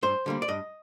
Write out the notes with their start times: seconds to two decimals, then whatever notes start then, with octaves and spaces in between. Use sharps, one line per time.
0.03 G2 C5
0.26 D3 G3 A#3
0.42 D5
0.48 G2 D#5